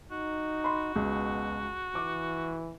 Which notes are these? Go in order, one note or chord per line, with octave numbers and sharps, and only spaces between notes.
D#4 F#4
B5 C6
C#2 B2
E3 D6